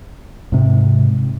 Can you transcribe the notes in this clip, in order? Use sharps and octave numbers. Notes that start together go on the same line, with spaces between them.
G#2 C3